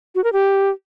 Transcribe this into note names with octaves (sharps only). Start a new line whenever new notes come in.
F#4
A#4
G4